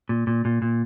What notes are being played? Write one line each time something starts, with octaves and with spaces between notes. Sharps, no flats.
A#2
A#2
A#2
A#2